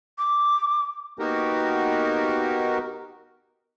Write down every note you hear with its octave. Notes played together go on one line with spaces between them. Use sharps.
D6
A#3 B3 D#4 F#4 G4 A#4